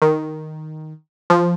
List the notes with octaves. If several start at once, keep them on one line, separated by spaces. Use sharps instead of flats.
D#3
F3